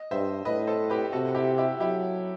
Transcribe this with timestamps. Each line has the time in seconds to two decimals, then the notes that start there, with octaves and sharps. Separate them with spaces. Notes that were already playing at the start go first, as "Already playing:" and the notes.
Already playing: D#5
0.11 G2 C5 E5
0.45 A2 B4 D#5
0.67 A4 C5
0.90 G4 B4
1.12 C3 F#4 A4
1.35 E4 G4
1.58 E4 G4
1.80 F#3 E4 G4